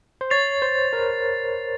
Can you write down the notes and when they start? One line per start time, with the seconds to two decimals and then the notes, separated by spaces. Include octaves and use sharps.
0.21 C5
0.30 C#5 A6 C7 F7
0.62 C5
0.93 A#4